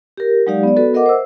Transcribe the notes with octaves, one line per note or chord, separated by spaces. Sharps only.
G4 A#4
F#3 G#3 D#4 G4 D5 F5
B3 D5
B3 F#4 A4 B4
A#4 D#5 E5 F#5 D6
C5 E6